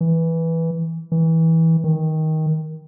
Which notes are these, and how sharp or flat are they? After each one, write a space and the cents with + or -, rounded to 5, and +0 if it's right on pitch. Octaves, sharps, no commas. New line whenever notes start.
E3 -5
E3 -20
D#3 +15